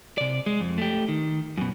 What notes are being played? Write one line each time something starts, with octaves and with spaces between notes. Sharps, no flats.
C3 D5
G#3
F2
A3 G4
D#3
F#2 B2